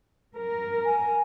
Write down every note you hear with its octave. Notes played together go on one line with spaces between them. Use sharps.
A#4
G#5